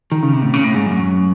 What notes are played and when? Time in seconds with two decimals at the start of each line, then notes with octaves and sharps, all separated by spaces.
0.12 D#3
0.22 C#3
0.33 C3
0.43 A2
0.54 C#3
0.64 A2
0.75 G#2
0.86 F#2